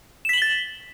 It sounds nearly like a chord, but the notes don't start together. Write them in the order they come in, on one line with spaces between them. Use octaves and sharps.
E7 B6 F#7 G7 A6